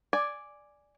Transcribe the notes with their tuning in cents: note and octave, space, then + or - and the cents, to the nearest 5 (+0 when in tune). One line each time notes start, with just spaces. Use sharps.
D5 +0 G#5 +0